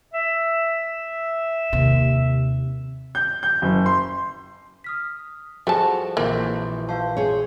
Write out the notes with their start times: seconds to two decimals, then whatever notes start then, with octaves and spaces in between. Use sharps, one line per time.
0.13 E5
1.73 D#2 C3
3.15 G6
3.43 G6
3.62 F#1
3.86 C6
4.84 D#6 F6 B6
5.67 F3 G3 F#4 G#4 A4 G#5 A5
6.17 A#1 E3 A#3 C4
6.89 B4 C5 F5 A5
7.17 G#4 C5 C#5